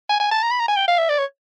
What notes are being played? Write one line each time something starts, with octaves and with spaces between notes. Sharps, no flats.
G#5
G#5
A5
A#5
B5
A#5
G#5
G5
F5
E5
D5
C#5